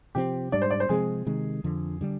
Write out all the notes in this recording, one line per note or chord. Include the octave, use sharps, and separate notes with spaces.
C3 F3 C4 G4
G#2 G3 D4 D5
C5
D5
C5
C3 F3 G#3 C4 G#4
C3 D#3 G#3
F2 D3 F3
D3 G3 D4